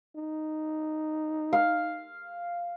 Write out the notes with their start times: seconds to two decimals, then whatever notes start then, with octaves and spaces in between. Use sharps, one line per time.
0.16 D#4
1.53 F5